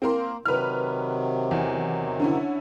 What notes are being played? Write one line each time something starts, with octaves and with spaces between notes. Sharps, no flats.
A#3 C4 A#4 C6
C3 D#3 F#3 B4 F6
E2
D3 C#4 E4